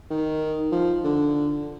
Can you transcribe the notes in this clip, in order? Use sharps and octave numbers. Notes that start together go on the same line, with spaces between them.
D#3
F3
D3